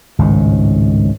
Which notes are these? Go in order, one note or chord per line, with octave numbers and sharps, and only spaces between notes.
G#1 C#2 A2